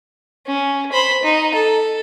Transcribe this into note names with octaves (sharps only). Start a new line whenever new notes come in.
C#4
C5 B5
D#4
A4